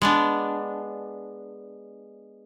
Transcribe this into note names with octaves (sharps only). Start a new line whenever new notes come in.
G#3 B3 D4